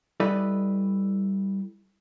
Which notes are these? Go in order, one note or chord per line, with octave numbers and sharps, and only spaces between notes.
G3 E4 A4 B4 D5 D#5